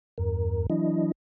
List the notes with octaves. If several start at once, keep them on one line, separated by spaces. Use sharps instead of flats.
E2 G2 A#4
E3 F#3 D4 E4 D#5